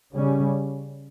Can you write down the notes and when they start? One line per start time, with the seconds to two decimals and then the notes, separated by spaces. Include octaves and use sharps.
0.13 C#3 G3 C#4